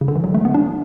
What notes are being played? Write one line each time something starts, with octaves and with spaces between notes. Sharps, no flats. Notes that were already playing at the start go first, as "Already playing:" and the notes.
C#3
D3
E3
F#3
A3
B3
D4